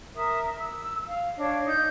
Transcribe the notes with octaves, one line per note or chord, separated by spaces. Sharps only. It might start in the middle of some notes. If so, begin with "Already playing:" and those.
A#4 E5 D#6
E6
F5
D4 C#5 D#5 F5
D#4 G6